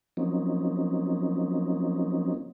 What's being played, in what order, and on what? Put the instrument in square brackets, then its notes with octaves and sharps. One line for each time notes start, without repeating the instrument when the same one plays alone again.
[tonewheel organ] F3 F#3 A#3 C4 C#4 D#4